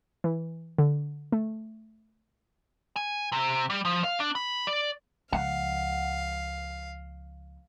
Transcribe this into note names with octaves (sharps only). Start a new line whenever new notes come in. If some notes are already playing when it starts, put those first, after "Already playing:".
E3
D3
A3
G#5
C3
G3
F3
F5
D4
B5
D5
C#2 F3 F5 F#5